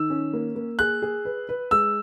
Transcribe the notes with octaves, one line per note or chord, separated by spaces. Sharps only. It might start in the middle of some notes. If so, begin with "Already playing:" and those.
Already playing: D#3 E6
C#4
A#3
A#3
G#4 F#6
G#4
B4
B4
G#3 E6